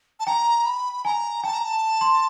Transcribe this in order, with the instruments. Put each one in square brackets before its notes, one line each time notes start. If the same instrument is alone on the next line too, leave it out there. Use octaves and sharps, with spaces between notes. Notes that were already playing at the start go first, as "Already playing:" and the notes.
[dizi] A5
[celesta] G5 [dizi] A#5
[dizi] B5
[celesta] G#5 [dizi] A#5
[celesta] G5 [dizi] A5
[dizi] A#5
A5
[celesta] C6